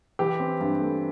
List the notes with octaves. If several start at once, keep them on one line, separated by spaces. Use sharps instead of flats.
E3 G4
C4
G2
A3